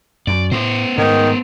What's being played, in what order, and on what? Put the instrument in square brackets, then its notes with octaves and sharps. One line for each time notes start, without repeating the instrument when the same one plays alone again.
[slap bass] F#2 [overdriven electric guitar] D5
[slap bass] A2 [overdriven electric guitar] B3 C5
[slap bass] G#2 [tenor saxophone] D#3